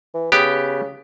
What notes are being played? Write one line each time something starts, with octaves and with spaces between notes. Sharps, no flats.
E3
C#3 B3 G4